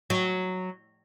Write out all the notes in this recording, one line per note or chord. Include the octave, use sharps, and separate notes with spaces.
F#3